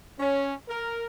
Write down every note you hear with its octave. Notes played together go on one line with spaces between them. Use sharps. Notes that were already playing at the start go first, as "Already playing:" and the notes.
C#4
A#4